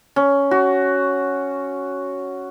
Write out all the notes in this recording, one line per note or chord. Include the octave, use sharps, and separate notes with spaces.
C#4
F#4